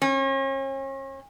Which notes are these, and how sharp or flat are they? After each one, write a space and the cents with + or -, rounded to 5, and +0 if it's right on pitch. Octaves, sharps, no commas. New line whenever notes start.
C#4 -40